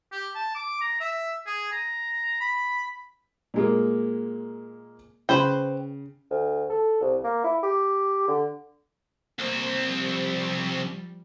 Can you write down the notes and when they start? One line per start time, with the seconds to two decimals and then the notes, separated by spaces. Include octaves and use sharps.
0.12 G4
0.35 A5
0.55 D6
0.81 A#5
1.00 E5
1.47 G#4
1.72 A#5
2.40 B5
3.54 A#2 G#3 A#3
5.29 C#3 B4 C5 G5
6.31 D2
6.70 A4
7.01 C2
7.24 A#3
7.44 E4
7.63 G4
8.28 D3
9.39 C2 A#3 C4
9.87 F3 G3